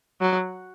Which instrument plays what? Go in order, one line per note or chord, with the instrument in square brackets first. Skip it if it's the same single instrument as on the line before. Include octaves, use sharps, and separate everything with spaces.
[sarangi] F#3